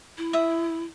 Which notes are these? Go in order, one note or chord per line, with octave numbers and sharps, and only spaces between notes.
E4
E5 D#6